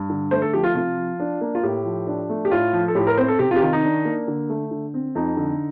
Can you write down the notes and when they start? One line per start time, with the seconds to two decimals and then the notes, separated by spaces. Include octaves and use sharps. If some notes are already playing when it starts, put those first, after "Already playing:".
Already playing: G2
0.10 D3
0.31 A3 C5
0.42 A4
0.53 F3 G4
0.64 F4
0.75 C3 F4
0.97 F3
1.20 D4
1.41 A#3
1.55 F4
1.63 A2 G4
1.85 F3
2.07 D4
2.29 A3
2.45 G4
2.51 A2 F4
2.73 F3
2.88 A4
2.95 A2 G4
3.07 A#4
3.17 C4 C5
3.28 A4
3.39 C3 G4
3.51 F4
3.56 G4
3.62 D#3 F4
3.73 D#4
3.83 D4
4.05 A#3
4.28 D3
4.49 A3
4.71 D3
4.94 C4
5.15 F2 D#4
5.37 D3